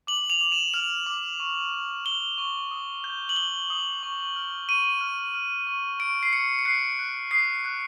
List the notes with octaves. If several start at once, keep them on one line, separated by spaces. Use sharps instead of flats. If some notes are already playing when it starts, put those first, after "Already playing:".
D6 F#7
F7
D6
E7
F6 F7
D6
C#6
C#6
F6 G7
C#6
D#6
G6
F#7
D#6 G7
D#6
C#6
F6
C#6 D#7
F6
F6
C#6
C#6 D7
C7
C#6 C#7
C#7
F#6 C7
F#6
D#6 C7
F#6